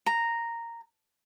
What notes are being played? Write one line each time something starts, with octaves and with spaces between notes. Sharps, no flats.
A#5